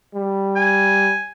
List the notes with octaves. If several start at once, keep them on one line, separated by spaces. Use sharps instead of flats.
G3
G#5